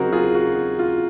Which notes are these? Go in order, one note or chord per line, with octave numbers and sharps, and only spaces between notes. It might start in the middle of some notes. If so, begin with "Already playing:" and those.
Already playing: C#3 F#3 C4 D#4 F#4 G#4 A#4 C5
F4 G#4
F#4
F4